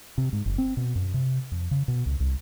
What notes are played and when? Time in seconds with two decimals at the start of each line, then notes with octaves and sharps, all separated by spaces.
0.18 C3
0.33 G#2
0.46 F#1
0.58 C4
0.77 B2
0.95 F#2
1.14 C3
1.52 F2
1.71 C#3
1.88 B2
2.06 C#2
2.20 C2